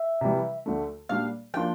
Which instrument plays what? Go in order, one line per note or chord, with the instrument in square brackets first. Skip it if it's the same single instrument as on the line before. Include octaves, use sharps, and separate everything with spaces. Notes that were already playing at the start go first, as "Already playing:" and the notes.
Already playing: [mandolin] E5
[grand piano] C3 E3 G3
D2 D3 A3
[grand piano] A#2 G3 D4 [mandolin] F5
[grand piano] F3 A#3 D4 F4 [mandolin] G5